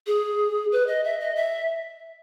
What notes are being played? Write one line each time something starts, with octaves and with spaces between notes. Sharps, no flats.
G#4
B4
D#5
E5
D#5
E5